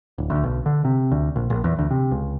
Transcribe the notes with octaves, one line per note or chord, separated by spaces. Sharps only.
D1
D2
B1
D3
C3
D2
A#1
A#1
E2
D2
C3
C#2